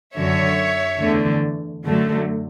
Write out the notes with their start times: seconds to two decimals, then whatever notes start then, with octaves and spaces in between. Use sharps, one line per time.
0.16 F#2 D3 F#3 C#5 E5
1.00 E2 D3 A3
1.85 F#2 D3 F#3 A3